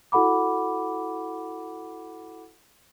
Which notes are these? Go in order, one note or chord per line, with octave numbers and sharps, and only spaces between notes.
E4 F#4 A4 F#5 B5 D6